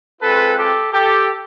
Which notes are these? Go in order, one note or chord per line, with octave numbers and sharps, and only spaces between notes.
G#3 C4 F4 A4 B4
G4 A4
G4 A4